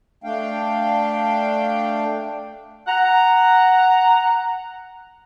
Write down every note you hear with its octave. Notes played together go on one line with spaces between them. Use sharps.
A3 D4 F5 G5
F#5 A#5